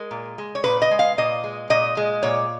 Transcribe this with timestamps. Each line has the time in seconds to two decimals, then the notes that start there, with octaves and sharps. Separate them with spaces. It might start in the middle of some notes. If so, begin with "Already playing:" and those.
Already playing: G#3 A#4
0.11 A#2
0.38 G#3
0.55 C#5
0.64 A#2 B4
0.82 D#5
0.91 G#3
0.99 F5
1.18 A#2 D#5
1.44 G#3
1.70 A#2 D#5
1.97 G#3
2.23 A#2 C#5